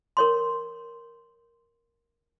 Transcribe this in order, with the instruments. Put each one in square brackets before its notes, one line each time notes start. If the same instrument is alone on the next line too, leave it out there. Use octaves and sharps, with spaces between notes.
[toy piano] A#4 C#5 C6